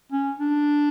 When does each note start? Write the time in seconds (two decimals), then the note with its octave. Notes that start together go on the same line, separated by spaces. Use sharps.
0.12 C#4
0.40 D4